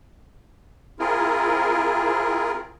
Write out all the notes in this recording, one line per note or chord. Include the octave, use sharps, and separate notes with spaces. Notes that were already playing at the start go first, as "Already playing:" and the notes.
C4 E4 F4 G#4 A#4